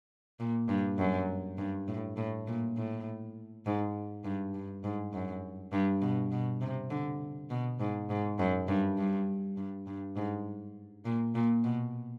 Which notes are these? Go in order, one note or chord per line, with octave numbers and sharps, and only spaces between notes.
A#2
G2
F#2
G2
A2
A2
A#2
A2
G#2
G2
G2
G#2
F#2
G2
B2
B2
C3
D3
B2
G#2
G#2
F#2
G2
G2
G2
G2
G#2
A#2
A#2
B2